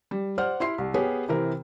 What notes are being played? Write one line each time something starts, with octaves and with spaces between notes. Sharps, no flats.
G3
C5 D5 F#5 F6
E4 C6 C7
C2
B3 G4 G#4 C#5 G#5
C3 E3 C4 A#4